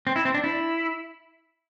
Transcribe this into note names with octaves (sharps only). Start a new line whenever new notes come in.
C4
E4
C4
D4
E4